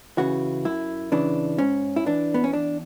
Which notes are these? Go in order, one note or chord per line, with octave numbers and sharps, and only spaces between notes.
C#3 E3 F#4
F#2 E4
C#3 E3 D4
G#2 C#4
E4
E3 D4
B3
C#4
E2 D4